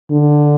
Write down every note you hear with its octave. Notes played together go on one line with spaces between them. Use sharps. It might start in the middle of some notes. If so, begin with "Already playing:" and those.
D3